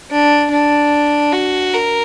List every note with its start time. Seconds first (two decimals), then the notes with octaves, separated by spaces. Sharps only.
0.11 D4
0.51 D4
1.32 F#4
1.74 A#4